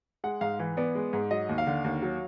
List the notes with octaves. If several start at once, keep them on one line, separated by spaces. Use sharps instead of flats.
G#3 F#5
G#2 F5
E3
B3 D5
G#3
G#2
F#3 D#5
D#2
F5
D3
D#2
F#3